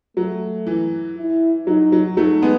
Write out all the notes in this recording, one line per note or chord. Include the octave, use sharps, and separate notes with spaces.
F#3 A3
E3
E4
F#3 D#4
F#3
F#3 A3 D#4
G#3 B3